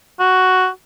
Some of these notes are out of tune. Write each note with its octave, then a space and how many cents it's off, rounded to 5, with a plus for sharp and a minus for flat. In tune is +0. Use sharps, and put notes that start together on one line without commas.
F#4 +5